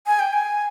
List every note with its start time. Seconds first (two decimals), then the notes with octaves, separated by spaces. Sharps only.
0.07 G#5
0.19 G5
0.33 G#5